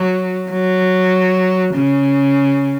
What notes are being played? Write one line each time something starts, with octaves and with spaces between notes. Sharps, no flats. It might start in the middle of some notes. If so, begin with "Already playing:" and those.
Already playing: F#3
F#3
C#3